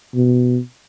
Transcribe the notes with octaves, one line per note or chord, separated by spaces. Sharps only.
B2